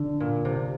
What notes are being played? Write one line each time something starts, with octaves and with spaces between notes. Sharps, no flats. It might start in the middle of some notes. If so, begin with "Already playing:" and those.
Already playing: D3
A#2
C3